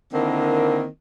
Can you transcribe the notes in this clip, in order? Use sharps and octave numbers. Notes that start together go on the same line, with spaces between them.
D3 D#3 A#3 C4 E4